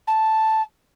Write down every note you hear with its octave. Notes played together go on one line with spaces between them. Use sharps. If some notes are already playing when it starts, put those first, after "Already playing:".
A5